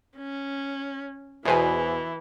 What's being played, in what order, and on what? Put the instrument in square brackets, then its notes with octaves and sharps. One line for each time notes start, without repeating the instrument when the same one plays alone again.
[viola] C#4
[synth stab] E2 B2 [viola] E3 [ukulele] G#4 C5 G#5